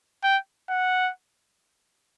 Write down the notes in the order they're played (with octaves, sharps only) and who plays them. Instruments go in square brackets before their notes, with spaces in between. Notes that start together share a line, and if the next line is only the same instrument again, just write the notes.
[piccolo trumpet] G5
F#5